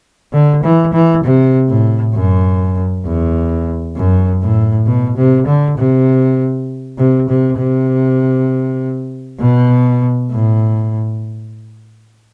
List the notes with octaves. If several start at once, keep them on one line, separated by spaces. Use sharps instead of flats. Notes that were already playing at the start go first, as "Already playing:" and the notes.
D3
E3
E3
C3
A2
F#2
E2
F#2
A2
B2
C3
D3
C3
C3
C3
C3
B2
A2